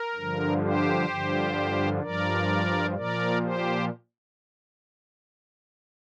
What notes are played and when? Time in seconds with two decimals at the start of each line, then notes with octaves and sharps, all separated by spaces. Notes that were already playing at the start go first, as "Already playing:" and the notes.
Already playing: A#4
0.15 G2 D3 F3
0.63 G4 C5
1.08 G2 D3 F3
2.02 G2 F3 A#4 D5
2.96 A#2 F3 A#4 D5
3.42 G4 C5